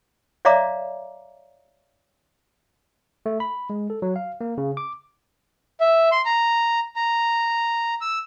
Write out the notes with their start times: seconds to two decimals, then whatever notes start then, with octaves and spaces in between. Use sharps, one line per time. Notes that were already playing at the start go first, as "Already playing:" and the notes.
0.45 C#5 D5 E5 F5 A#5 D6
3.26 A3
3.40 B5
3.70 G#3
3.90 A4
4.02 F#3
4.16 F5
4.41 A#3
4.58 C#3
4.77 D6
5.80 E5
6.12 C6
6.25 A#5
6.96 A#5
8.01 E6